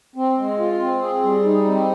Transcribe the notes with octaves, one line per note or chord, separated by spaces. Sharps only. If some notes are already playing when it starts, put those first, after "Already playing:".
C4
G#3
F4
C4
G#4
G3
D#4
C4